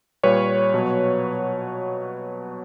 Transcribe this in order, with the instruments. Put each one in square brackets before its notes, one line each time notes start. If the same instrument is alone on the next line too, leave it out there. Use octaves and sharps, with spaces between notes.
[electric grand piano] A#2 G3 B4 C#5
B2 F#3